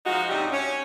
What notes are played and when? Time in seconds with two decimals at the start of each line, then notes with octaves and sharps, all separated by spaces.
0.06 F3 G#3 D#4 F#4
0.29 G#2 C3 F#3 D4 D#4 G4
0.52 C#4